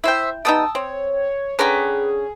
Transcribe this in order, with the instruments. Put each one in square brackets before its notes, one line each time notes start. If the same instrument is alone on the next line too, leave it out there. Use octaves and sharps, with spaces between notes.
[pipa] E4 G5 [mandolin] C5 E5
[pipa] G3 B3 D#4 [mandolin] G5 D#6 E6 [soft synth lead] A5
[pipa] C4 [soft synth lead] C#5
[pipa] D3 C#4 A#5 [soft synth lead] G#4 [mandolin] B4 G5